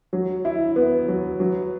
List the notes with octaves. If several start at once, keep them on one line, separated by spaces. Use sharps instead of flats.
F#3
E4
B3
F#3
F#3